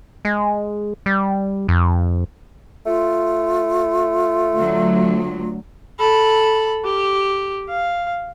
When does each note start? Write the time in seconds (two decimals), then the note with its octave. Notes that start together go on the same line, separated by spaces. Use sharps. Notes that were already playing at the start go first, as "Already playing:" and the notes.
0.25 G#3
1.06 G3
1.69 F2
2.86 A3 F4
4.55 D2 F#3
5.99 A4 B5
6.84 G4
7.69 F5